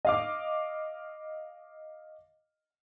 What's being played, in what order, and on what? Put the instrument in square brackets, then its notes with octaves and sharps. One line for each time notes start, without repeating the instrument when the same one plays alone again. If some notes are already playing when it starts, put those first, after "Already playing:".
[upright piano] D#5 F5 D6